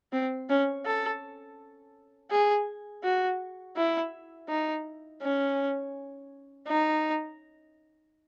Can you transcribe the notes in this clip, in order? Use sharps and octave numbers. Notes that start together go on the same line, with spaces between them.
C4
C#4
A4
G#4
F#4
E4
D#4
C#4
D#4